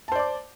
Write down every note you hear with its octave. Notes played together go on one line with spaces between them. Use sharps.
C5 D5 A5 D6